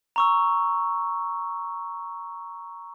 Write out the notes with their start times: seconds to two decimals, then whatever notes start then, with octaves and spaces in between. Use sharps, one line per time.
0.16 A#5 C#6 E6